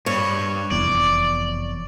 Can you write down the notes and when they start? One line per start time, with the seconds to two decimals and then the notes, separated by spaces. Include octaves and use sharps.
0.06 G2 C#5
0.71 F1 E2 D5